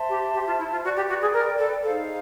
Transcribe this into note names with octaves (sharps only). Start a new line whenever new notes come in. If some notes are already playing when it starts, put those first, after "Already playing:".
Already playing: C5 E5 A5 C6
G4
G4
F4
E4
F4
F#4 B4 D5 G5
G4
F#4
G#4
A#4
A4
D#4 G#4 A4 C5 F5